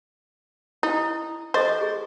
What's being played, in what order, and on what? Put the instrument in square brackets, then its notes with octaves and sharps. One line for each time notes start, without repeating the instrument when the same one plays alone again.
[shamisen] D#4 [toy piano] E4
[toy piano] A4 D#5 C#6 [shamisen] C5
[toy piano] G#4